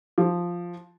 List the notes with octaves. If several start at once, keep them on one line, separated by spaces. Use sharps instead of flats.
F3